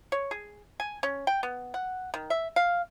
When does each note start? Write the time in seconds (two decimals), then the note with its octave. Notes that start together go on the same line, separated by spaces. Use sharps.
0.12 C#5
0.31 G#4
0.80 G#5
1.03 C#4
1.27 G5
1.43 B3
1.74 F#5
2.14 D#3
2.30 E5
2.56 F5